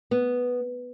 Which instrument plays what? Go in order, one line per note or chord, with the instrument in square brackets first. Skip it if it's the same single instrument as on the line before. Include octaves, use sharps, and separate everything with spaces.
[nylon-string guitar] B3